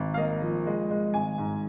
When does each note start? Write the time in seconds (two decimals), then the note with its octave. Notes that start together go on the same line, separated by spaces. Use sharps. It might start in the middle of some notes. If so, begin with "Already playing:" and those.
Already playing: G#1
0.14 F5
0.17 A#3 D#5
0.42 F3
0.67 G#3
0.91 G#3
1.14 G#1 G#5
1.38 G#2